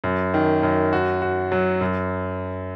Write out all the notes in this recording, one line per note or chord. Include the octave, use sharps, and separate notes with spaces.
F#2
D#3
F#2
F#4
F#4
F#3
F#2